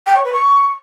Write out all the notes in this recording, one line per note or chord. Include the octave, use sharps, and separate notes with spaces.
G5
C#5
B4
C#6